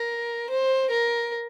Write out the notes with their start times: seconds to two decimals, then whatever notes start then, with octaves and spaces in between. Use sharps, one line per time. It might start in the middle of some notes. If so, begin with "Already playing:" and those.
Already playing: A#4
0.50 C5
0.91 A#4